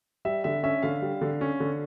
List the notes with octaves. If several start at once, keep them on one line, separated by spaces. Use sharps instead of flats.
G3 E5
D3 E5
C#4 E5
D3 F5
G3
D3
C#4
D3